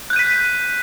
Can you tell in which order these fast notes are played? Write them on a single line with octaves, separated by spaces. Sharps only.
F#6 G6 D#7 B6